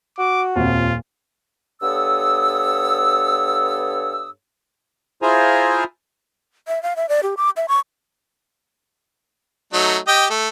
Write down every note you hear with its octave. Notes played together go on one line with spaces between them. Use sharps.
F#4 D6
D#1 F2 F4
G2 B3 A4 C#5 D#6 E6
E4 F4 G#4 C5 G#5 A#5
E5
F5
E5
D5
G4
D6
E5
C#6
F#3 A3 D#4
G4 D#5 G5
A3